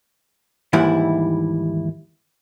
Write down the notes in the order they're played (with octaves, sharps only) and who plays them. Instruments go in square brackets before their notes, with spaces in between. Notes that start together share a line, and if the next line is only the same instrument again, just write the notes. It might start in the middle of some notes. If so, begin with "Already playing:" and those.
[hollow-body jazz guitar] D#2 G#2 E3 G3 E4